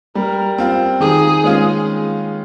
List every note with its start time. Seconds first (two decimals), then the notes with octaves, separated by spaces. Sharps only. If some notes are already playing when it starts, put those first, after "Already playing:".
0.15 G3 A#4
0.58 C4 F4
1.00 D#3 G#4
1.44 G#3 C#4 F4